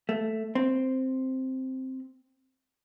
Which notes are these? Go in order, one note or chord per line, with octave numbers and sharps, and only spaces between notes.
A3
C4